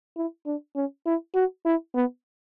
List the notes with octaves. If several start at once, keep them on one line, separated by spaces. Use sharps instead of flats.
E4
D4
C#4
E4
F#4
E4
B3